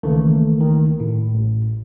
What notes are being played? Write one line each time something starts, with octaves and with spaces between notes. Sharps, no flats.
C#2 D#3 E3 A3 A#3
D#3
A2
A1